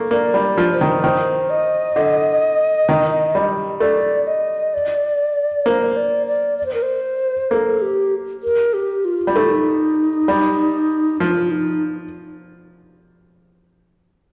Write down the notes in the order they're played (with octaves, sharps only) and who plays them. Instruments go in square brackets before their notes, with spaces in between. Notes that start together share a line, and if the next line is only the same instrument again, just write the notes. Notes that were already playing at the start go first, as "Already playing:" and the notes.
Already playing: [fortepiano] A3 A#3
[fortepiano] A#3 [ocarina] D5
[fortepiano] G3
[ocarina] D5
[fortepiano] F3
[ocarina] C5
[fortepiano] D#3
[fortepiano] D#3 [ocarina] C5
[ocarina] D#5
[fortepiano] D3
D#3
G3
[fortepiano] A3 [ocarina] D5
[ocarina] D#5
D5
[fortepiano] A#3 [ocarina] C5
[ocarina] D5
D5
D5
C5
A#4
C5
[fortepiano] A#3 [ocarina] A4
[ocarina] G4
A#4
G4
F4
[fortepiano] G3
[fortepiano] A3 [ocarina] D#4
[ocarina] F4
D#4
[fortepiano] G3
[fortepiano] F3 [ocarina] F4
[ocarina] D#4